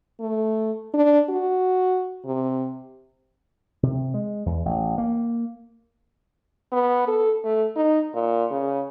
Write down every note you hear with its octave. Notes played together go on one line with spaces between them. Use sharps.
A3
D4
F#4
C3
C3
G#3
E2
A1
A#3
B3
A4
A3
D#4
A#2
C#3